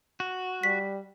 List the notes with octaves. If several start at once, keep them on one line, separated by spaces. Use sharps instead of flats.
F#4
G3 B6